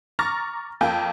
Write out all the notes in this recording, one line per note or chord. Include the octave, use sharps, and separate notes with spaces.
A#5 C#6 D6 F6 A6 A#6
F2 A#3 G5